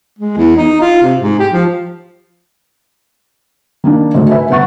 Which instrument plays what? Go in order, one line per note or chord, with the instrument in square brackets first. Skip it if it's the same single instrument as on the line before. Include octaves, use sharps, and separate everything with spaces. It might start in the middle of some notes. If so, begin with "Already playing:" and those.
[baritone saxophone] G#3
E2
D#4
F4
C3
G#2
G4
F3
[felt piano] D#3 A#3 D4
G#1 D2 A3 D#5
B4 E5 G#5
G1 B3 E5 F#5 C#6 A6